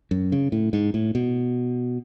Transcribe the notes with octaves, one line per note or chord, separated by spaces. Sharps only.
F#2
C#3
A2
G#2
A2
B2